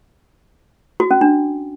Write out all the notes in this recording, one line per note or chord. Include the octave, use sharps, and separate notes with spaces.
F#4
C#4
D4